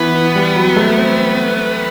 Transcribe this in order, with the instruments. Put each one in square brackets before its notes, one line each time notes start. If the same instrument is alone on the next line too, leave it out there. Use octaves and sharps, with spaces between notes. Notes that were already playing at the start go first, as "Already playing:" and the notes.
Already playing: [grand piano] E3 [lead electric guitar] B3
[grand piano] E3
G3
F#3
A3
C4